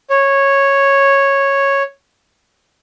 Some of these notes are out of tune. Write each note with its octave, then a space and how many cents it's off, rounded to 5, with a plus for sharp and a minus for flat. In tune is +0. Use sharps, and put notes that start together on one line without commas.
C#5 -5